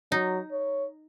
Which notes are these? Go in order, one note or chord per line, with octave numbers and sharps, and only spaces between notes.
F#3 D#4
C#5